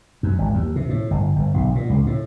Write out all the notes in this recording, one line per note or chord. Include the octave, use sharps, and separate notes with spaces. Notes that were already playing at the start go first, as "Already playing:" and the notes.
F#2
G#1
D#2
C3
A2
G1
G1
B1
A#2
C#2
A2